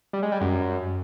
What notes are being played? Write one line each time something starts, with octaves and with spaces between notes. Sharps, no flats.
G3
G#3
G3
F#2